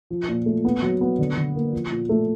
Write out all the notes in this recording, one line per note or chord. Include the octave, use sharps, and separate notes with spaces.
F3
A#2
A3
B3
F#3
B3
D3
D3
A#3
F3
A#2
A3